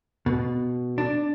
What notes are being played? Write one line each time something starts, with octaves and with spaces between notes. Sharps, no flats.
B2
D4